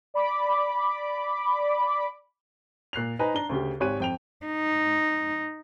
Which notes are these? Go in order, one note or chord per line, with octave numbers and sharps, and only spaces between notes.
D5 B5 D6
A#2 F#6 C7 F7
D#4 B4 C5 G#5 A#5
D4 A#5 G7
D2 C#3 G4
G#1 G4 C#5 G#5 F#6 D#7
F2 G5 F7
D#4